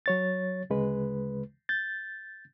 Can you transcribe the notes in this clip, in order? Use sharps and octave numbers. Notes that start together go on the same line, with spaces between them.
F#3 C#5 A6
D2 C#3 G#3 B4
G6 A6